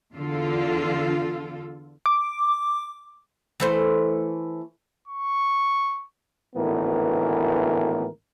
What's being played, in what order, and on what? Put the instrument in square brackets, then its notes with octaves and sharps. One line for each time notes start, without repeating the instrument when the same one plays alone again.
[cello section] E2 D3 F4 A4
[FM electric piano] D6
[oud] E3 A3 C5
[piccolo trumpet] C#6
[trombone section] G#1 D2 A2 E3 B3 A#4